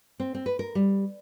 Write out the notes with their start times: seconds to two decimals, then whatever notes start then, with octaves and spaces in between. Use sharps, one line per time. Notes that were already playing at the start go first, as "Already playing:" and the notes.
0.20 C4
0.35 C4
0.46 B4
0.59 A#4
0.75 G3